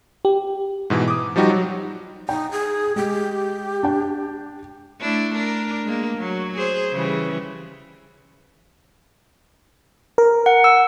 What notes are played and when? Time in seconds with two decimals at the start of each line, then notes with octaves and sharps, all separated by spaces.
0.25 G4
0.90 G#2 B2 E3
1.08 D6 D#6
1.36 F3 G3 D#4 F#4 G4
1.50 F#3
2.29 D#4 G5
2.51 G#4
2.96 G#3 G4
3.83 D4 G5
5.01 A3 D4 E4
5.35 D4 A#4
5.85 G#3 A#3
6.18 F#3
6.54 G#4 C5
6.91 C#3 E3 G3
10.18 A#4
10.46 F#5
10.64 E6